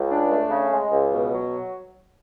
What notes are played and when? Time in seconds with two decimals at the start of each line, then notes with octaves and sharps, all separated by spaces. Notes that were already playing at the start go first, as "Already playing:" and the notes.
Already playing: C#2
0.10 D4
0.31 A3
0.50 C#3
0.71 G#3
0.92 C#2
1.12 B2
1.33 F#3